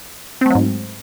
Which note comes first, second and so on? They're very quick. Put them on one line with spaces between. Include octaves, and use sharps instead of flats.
C4 A3 F#3 G#2